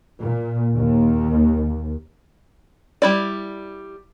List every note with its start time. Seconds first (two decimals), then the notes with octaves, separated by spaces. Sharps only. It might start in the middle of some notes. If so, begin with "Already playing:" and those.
0.22 A#2
0.76 D#2
3.02 G3 E4 D5